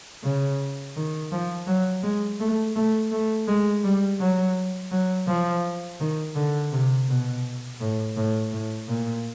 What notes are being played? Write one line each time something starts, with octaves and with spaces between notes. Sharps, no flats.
C#3
D#3
F3
F#3
G#3
A3
A3
A3
G#3
G3
F#3
F#3
F3
D#3
D3
C3
B2
A2
A2
A2
A#2